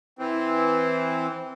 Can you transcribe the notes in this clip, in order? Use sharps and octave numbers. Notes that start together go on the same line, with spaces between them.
E3 C4